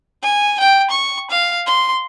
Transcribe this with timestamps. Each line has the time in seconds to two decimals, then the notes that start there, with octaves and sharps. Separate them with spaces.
0.22 G#5
0.60 G5
0.90 C#6
1.30 F5
1.66 C6